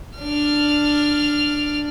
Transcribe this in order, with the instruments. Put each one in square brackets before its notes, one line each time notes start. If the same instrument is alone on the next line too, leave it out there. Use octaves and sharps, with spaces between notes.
[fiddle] D4 F6